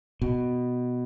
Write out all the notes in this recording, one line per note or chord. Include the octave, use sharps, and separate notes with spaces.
B2